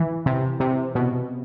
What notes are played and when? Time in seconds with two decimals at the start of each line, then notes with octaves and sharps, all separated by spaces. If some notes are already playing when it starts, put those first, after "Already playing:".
Already playing: E3
0.26 C3
0.60 C3
0.95 B2